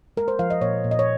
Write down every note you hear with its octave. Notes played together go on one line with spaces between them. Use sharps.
G#3 A#4
C5
F3 F5
D#5
A#2 C#5
A#2
D#5
C#5